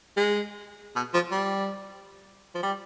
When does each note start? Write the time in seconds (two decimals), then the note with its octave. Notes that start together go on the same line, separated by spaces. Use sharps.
0.17 G#3
0.96 B2
1.14 F3
1.31 G3
2.55 F3
2.63 G3